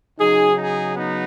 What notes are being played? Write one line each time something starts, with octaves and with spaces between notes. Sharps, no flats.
C#3 F#3 D#4 G#4
D#4 G#4
B3 D#4